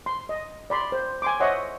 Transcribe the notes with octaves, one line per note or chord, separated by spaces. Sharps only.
C6
D#5
D5 B5 C6
C5
G#5 C6 D6
C5 C#5 D#5 E5 F#5 C6